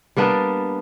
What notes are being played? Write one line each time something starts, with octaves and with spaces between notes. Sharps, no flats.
G3 A#3 B3 D4